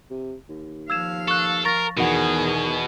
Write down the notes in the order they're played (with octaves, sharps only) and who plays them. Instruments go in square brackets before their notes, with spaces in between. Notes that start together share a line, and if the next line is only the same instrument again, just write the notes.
[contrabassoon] C3
D#2
[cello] F3 F5 [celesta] E6 G#6 E7
[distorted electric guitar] A4 [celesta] C#6 F#6
[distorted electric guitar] A#4 [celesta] C#6 A6 A#6
[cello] E2 G#4 [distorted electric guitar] B2 [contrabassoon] D#3 [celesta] F#4 F#5